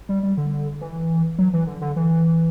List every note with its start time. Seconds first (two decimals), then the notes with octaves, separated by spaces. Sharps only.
0.09 G3
0.23 G3
0.37 D3
0.81 E3
1.38 F#3
1.53 E3
1.67 D3
1.81 D3
1.96 E3